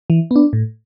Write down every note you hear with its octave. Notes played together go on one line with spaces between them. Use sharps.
E3
B3 D4
A2